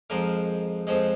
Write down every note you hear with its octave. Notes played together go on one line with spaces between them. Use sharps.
F2 F3 G#3 A#4
F2 F3 G#3